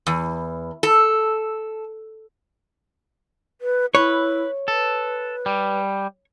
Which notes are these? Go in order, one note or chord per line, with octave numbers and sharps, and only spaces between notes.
E2
A4
B4
E4 B4 C#5
A4 B4
G3